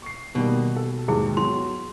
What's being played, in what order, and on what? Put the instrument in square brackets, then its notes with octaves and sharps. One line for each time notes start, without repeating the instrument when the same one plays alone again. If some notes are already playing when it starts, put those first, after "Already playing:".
[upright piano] C#6 C7
[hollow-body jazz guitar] B2 [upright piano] D#3 G3 A#3
[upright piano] A4
[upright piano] D#2 G#2 [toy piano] E4 G#4
[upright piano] F#3 B3 [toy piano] C6